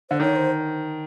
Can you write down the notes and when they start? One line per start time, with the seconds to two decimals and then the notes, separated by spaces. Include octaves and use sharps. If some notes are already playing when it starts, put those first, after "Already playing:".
0.10 D3 C5
0.20 D#3 C#5
0.36 C5